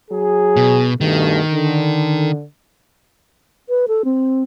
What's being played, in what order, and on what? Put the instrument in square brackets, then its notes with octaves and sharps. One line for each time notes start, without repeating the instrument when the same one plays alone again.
[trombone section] F#3 G#4
[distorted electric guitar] B2
[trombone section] G2 B2 A3 [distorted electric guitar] D#3
[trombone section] D3
[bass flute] B4
A4
C4